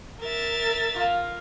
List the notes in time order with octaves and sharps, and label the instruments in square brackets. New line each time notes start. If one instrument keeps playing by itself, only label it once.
[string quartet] A#4 E5 A6
[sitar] A#3 F4